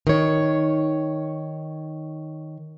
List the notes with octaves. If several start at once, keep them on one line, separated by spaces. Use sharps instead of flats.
D#3 C#5